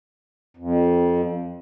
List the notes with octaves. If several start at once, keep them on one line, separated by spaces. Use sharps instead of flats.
F2